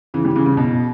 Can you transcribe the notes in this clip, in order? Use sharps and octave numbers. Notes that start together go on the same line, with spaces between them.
C#3 E3
E3 G3
C#3 E3
C#3
B2